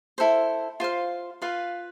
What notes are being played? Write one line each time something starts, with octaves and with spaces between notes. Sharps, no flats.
E4 A4 C5
F4 C5 F5
F4 B4 F5